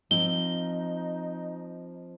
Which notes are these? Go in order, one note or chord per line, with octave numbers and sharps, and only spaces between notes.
F3 C4 D#4 G7